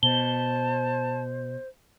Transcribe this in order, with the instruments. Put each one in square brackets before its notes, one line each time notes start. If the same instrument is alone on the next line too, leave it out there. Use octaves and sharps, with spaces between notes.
[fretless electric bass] B2 [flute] C5 [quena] A5 [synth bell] G7